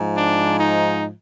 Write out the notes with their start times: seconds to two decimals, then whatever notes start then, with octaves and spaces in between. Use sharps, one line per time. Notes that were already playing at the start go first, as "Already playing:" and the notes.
Already playing: G#2 F3
0.16 D4
0.59 D#4